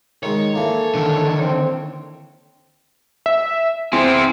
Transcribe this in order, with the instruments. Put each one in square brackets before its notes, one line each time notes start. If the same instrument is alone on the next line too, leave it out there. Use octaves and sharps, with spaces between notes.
[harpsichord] D#3 G#3 [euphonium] D#4 [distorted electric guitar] C#5
[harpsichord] E3 A#3 [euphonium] A4
[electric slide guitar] D3 D#3
[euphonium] C4
[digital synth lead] E5
[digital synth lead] C4 [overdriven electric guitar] E4 G#4